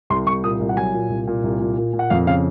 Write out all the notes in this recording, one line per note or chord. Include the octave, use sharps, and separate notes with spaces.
C2 C6
C2 C#6
A#2 D#6
C2
F#5
F#3 G#5
A#2
C2
A#2
C2
A#2
A#2
A#2
F#5
F2 F5
C#3 F5